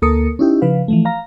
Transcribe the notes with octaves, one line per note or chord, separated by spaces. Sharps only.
D2 A#3 A4 A#4 D#6 C#7
C#4 D#4 E4 G4
C#3 F3 B4 F5
E3 F3 A3
F5 A#5